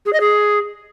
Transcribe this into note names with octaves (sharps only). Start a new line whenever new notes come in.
G#4
D#5
G#4